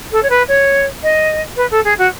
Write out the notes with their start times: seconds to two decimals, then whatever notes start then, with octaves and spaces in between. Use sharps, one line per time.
0.12 A4
0.23 C#5
0.30 B4
0.48 C#5
1.03 D#5
1.57 B4
1.71 A4
1.84 G#4
1.98 F#4